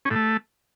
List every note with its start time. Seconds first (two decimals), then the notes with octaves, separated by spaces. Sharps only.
0.05 C#4
0.10 A2
0.16 A3